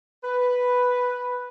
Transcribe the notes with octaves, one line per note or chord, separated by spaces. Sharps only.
B4